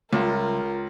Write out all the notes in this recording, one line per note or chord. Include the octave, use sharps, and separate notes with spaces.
C#2 C#3 G3 F4 A#4 E5